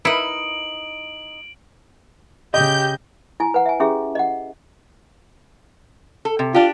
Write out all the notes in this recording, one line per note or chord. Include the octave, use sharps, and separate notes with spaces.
D#4 E4 A#4 B4 E5 D#6 D7 F#7
C#3 G4 D#5 G6
E4 G#5
B4 F#5
E5 G#5
C#4 E4 G4 G#4 E5
D#5 F#5
A4
C3
D4 F4 G4